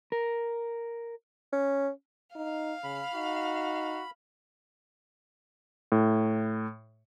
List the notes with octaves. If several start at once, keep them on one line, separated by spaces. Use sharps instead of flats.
A#4
C#4
D#4 F5
C#3 B5
D#4 F#4
A2